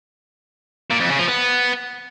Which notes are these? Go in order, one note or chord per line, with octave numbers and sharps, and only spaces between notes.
A#2
F2
C#3
F3
B3